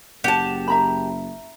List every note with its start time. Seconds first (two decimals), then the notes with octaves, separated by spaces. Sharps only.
0.24 F#1 G4 F#5 A5
0.68 E5 A#5 B5